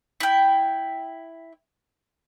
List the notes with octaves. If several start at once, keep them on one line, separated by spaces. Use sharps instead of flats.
E4 G5